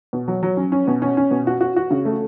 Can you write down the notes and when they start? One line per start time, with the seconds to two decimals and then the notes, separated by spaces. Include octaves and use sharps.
0.13 B2
0.28 F#3
0.43 F#3
0.57 C#4
0.72 C#4
0.88 B2
1.02 C#4
1.17 C#4
1.31 B2
1.47 F#4
1.61 F#4
1.76 F#4
1.91 C#3
2.05 A3